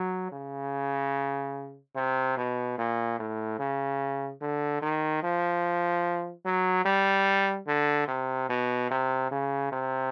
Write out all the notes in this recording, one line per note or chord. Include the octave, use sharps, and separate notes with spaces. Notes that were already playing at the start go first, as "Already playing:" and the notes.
Already playing: F#3
C#3
C3
B2
A#2
A2
C#3
D3
D#3
F3
F#3
G3
D3
C3
B2
C3
C#3
C3